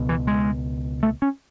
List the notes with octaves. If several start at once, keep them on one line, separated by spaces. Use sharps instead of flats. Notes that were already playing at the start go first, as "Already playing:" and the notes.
Already playing: C#2 B2
E3
G#3
A3
C#4